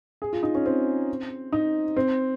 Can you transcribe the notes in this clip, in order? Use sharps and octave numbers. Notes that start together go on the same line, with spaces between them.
G#4
F4
D#4
C#4
C4
D#4
C4